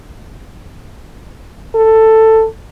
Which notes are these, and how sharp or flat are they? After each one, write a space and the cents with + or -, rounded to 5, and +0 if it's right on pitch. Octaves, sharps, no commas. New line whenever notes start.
A4 +10